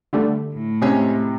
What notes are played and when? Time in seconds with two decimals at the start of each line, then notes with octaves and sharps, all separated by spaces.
0.13 D3 G3 A3
0.53 A2
0.82 C3 G#3 C#4 C#5